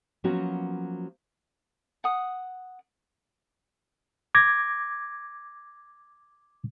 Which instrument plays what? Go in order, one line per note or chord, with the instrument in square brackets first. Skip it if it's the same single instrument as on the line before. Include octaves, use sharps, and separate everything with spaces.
[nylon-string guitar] F3 F#3 A#3 B3 C#4 F#4
[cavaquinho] F#5 D#6
[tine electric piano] D6 G#6 A#6